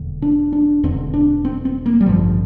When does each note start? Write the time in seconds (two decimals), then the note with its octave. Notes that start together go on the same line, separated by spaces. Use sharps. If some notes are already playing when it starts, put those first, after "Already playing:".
Already playing: E1 E2 D3
0.22 D4
0.53 D4
0.84 E1 E2 D3 C4
1.14 D4
1.45 C4
1.65 C4
1.86 A#3
2.01 G3
2.06 A1 G2 D3 F3